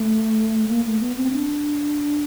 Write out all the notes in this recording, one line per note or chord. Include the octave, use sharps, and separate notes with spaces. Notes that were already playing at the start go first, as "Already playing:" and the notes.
Already playing: A3
A#3
A3
B3
C4
D4